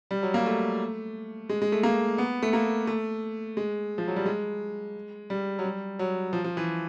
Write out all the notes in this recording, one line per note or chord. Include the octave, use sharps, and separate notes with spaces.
G3
F#3
A#3
A3
G#3
G#3
A3
A#3
B3
A3
A#3
A3
G#3
F3
F#3
G3
G#3
G3
F#3
G3
F#3
F3
F3
E3